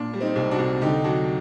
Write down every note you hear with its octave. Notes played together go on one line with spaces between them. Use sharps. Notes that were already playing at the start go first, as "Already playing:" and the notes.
Already playing: A#2 D4
G3
C4 D#4
C2
D4 F#4
C2
D3 D#4 G4
F#3 D4 F#4